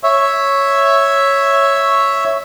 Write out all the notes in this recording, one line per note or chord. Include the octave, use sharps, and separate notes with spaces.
C#5 E5